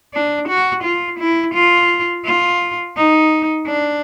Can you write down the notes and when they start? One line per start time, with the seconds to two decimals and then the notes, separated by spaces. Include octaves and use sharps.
0.14 D4
0.48 F#4
0.83 F4
1.19 E4
1.54 F4
2.25 F4
2.97 D#4
3.67 D4